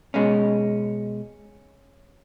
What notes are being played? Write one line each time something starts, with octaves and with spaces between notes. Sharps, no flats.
B2 G#3 C#4